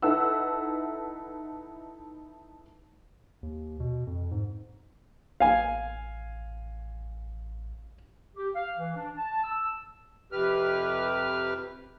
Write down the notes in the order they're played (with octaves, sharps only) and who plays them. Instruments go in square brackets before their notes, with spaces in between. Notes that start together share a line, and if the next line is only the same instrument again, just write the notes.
[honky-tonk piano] D#4 E4 A4 B4 F#5 E6
[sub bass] D#2
B2
F2
G#2
[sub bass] A1 [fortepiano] F5 G#5
[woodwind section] G4
F5
E3
D4
A5
E6
[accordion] F2 C3 G4 B4 F6